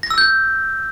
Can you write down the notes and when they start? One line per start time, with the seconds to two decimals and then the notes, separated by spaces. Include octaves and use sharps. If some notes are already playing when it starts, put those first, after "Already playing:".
0.03 A#6
0.10 E6
0.18 G6